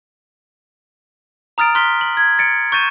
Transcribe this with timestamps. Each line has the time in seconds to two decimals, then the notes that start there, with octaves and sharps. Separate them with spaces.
1.58 A#5 D#6 F6 A6 D7
1.75 C6 F6 F#6 B6 G7
2.01 F#7
2.17 G#6
2.39 A6 C#7 D7
2.72 C#6 G6 A6 D#7 E7